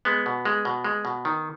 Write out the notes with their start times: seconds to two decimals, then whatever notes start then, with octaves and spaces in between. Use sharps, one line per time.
0.05 G#3 B3
0.26 B2
0.45 G#3
0.65 B2
0.84 G#3
1.05 B2
1.25 D#3